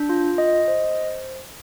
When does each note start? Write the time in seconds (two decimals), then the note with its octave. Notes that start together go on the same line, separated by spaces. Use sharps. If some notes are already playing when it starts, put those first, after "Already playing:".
Already playing: D4
0.09 F4
0.38 D#5
0.68 C5